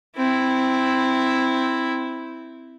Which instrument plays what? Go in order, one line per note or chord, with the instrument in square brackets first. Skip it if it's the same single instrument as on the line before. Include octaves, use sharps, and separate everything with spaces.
[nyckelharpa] C4 E4